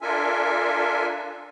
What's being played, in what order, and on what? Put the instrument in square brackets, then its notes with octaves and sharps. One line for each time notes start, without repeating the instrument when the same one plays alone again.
[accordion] D4 F4 A4 A#4 E5 G#5